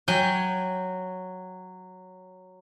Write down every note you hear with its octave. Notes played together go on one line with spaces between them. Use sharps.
F#3 G5 G#5